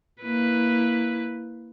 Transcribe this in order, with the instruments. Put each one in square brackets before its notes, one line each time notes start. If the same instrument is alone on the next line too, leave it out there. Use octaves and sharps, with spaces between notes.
[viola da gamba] A#3 E4 B4